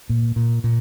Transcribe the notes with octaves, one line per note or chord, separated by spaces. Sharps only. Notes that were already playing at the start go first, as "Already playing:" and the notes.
A#2
A#2
A#2